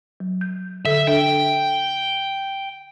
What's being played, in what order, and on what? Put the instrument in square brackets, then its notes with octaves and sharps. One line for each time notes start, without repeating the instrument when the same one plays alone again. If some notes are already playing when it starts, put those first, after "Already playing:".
[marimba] F#3
G6
[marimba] D3 A4 [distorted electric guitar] E5
[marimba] D4 A4 E5 [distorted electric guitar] G5